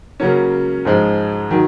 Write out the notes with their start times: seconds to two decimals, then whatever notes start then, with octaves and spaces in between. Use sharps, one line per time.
0.20 C#3 F#3 A#3 C#4
0.85 G#2 F3 G#3
1.51 D#3 F#3